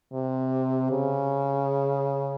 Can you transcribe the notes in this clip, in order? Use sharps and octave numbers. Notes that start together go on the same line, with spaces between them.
C3
C#3